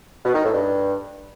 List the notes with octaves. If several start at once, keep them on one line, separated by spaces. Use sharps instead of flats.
B2
D#3
A2
G2